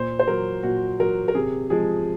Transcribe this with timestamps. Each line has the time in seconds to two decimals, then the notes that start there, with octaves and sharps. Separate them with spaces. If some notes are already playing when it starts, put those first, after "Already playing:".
Already playing: A#2 C5
0.19 C5
0.27 F#3 A#4
0.63 A#2 F#4
1.00 F#3 A#4
1.28 A#4
1.35 C3 G#4
1.70 F3 G#3 G#4